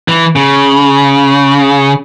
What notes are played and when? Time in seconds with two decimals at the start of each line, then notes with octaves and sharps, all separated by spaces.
0.08 E3
0.36 C#3